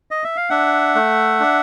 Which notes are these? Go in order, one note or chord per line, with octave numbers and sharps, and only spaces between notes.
D#5
E5
F5
D4 E5 F#5
A3
D4